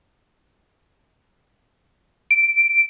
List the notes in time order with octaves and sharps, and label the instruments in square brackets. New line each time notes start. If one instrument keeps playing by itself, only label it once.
[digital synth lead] D7